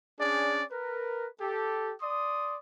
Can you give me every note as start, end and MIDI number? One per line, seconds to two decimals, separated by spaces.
0.19 0.63 61
0.19 0.63 62
0.19 0.63 68
0.19 0.63 74
0.72 1.27 70
0.72 1.27 71
1.40 1.93 67
1.40 1.93 69
2.01 2.56 74
2.01 2.56 84
2.01 2.56 87